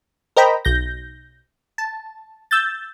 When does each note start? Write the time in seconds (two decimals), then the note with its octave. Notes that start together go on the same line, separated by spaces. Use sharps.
0.36 A#4 C5 D#5 G5 A#5 B5
0.65 B1 G6 A#6
1.78 A5
2.51 E6 G6 A6